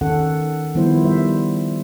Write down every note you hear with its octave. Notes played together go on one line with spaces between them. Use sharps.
D#3 C#4 A4 F#5
D#3 F3 G3 B3 E4 C5
G3 C5 E5